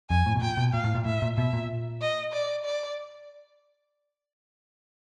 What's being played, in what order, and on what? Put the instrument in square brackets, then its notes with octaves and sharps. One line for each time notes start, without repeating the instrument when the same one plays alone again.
[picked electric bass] F2 [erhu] G#5
[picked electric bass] A2
B2
[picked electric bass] A#2 [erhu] G5
[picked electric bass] B2
[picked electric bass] A#2 [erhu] F5
[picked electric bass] A2
A#2
[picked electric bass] A2 [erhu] E5
[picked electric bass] A#2
[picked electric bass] B2 [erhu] E5
[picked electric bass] A#2
[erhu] D#5
D5
D5